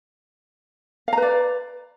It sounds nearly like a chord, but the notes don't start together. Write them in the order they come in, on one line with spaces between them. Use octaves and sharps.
F5 A#5 B4 D5